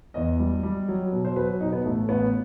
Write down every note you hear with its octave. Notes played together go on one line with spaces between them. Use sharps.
E2 D#5
G3
G3
F#3
B2
C5
F#3 B4
B2 D#4
B3
A1 A3
A1 B3